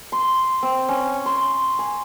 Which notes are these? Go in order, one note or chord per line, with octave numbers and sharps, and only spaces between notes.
C6
C4
C#4
C6
G#5